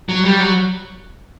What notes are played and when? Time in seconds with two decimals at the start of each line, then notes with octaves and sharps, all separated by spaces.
0.09 F#3
0.25 G3
0.40 F#3